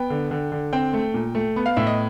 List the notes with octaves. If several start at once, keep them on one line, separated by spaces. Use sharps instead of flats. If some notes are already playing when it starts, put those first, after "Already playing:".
Already playing: B3 G5
D3
D3
D3
C4 G5
A3
A#2
A3
B3
F5
A2 E5
D#5